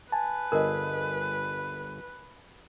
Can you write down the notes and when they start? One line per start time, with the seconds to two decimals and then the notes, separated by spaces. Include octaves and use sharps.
0.12 B4 G#5 A5
0.52 G1 G#4 A#4 D#5